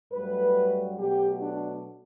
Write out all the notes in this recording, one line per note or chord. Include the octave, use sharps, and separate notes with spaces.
G2 F#3 A3 B4
B2 F#3 A3 G4
D4